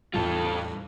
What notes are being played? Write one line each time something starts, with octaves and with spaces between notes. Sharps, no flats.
E2 A2 G3 F4 A4